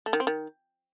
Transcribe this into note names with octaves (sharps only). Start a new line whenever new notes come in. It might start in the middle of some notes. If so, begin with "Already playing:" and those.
A3
D#3
C4
D#3